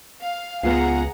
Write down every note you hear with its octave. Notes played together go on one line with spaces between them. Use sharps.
F5
C#2 B3 F4 G#4 F5 F#5 A#5